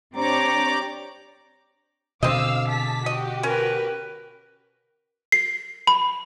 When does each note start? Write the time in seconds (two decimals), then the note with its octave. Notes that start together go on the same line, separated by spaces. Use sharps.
0.15 C4 D4 G4 C#5 D5 A#5 D6
2.23 B2 D3 C4 D#5 F5 D6 E6
2.69 G#4 A5 B6
3.06 F#4 G4 D#5
3.43 C#4 A#4 B4
5.32 C7
5.87 B5